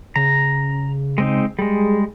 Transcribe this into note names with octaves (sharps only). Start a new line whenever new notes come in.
C#3 A#5
G#3 C4 D#4
G3 G#3 G#4